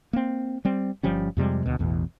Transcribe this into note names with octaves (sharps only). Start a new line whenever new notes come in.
A#3 C4
G3 C4
G1 F3 G3 C#4
F2 C3 G3 G#3
D2 B2
A1 E2 B2